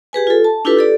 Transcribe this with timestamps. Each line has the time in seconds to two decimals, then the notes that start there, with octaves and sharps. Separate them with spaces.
0.13 G4 G#4 B4 G#5
0.27 F4 A4
0.44 A5
0.65 D4 E4 F4 G4 A4 B4
0.77 G4 A4 D5